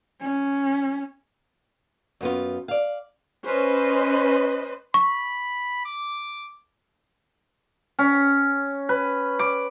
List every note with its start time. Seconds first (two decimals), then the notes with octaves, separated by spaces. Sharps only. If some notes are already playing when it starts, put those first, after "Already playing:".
0.21 C#4
2.21 F#2 B3 F4
2.68 D5 F5
3.45 C#4 B4 C5 D#5
4.94 B5 C#6
5.85 D6
7.99 C#4
8.89 B4
9.39 D6